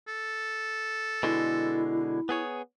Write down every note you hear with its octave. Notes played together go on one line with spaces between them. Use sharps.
A4
B2 D3 G#3 E4
B3 G#4 C#5